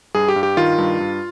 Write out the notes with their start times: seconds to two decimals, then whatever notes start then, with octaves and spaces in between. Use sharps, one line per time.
0.15 G2 G#4
0.28 G4
0.36 G2
0.43 G4
0.57 D#3 F4
0.78 G2
1.00 G2